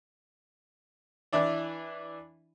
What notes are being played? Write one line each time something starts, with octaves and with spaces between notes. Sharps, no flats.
E3 D4 E4 D5